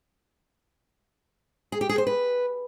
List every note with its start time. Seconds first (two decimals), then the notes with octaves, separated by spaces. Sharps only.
1.72 G#4
1.81 G4
1.89 G#4
1.98 C5
2.07 B4